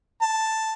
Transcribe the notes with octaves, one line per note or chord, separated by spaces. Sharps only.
A5